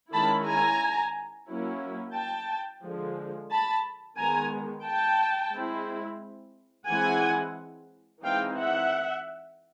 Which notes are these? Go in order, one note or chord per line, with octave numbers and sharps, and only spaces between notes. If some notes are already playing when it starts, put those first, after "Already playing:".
D#3 G#3 C#4 E4 A5 B5
G#5 A#5
F#3 A#3 C#4 E4
G5 A5
D3 F3 G#3
A5 B5
D#3 G#3 B3 G#5 A#5
G5 A5
G#3 C4 E4
E3 G#3 C4 E4 F#5 G#5
E3 G#3 C4 D#4 F5 G5
E5 F#5